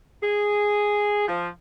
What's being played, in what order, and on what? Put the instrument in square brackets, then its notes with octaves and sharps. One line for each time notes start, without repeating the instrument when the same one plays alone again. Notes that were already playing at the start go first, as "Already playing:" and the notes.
[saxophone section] G#4
F3